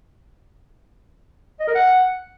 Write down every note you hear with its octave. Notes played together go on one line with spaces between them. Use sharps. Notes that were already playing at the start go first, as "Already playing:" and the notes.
D#5
A#4
F#5